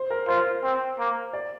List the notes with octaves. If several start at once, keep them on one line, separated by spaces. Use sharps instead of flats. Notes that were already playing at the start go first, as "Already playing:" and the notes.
Already playing: C5
A#4
F4 C5
C4
A#3
D5